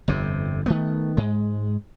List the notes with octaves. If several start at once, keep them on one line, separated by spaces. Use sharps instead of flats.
G1 F2 C3
D#3 A3 B3
G#2 G#3